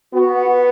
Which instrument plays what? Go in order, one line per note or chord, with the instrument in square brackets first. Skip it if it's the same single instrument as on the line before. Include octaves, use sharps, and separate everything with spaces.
[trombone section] B3 [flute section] F#4
[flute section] F#5
B4